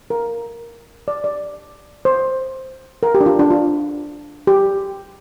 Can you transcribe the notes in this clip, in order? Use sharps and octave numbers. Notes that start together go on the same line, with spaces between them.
A#4
D5
D5
C5
A#4
G4
D4
F4
D4
F4
G4